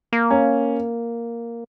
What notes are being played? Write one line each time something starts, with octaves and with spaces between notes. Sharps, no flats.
A#3
C#4